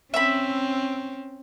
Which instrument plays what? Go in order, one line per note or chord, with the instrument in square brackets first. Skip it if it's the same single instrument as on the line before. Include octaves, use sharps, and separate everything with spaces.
[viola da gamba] C4 C#4 [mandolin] E5 B5